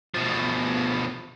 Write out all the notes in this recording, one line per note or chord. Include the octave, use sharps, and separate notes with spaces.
B2 F3